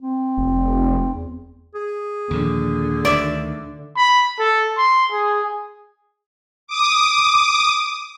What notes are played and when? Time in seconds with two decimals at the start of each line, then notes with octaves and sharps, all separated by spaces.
0.02 C4
0.38 F1
1.13 E2
1.75 G#4
2.31 D#2 A#2 D3 F3
3.05 D2 D#3 D5 E5
3.97 B5
4.39 A4
4.78 C6
5.12 G#4
6.67 D6 D#6